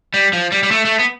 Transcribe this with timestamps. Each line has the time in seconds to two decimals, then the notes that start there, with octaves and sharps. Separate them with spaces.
0.14 G3
0.33 F3
0.52 G3
0.63 G3
0.71 A3
0.85 A3
0.99 B3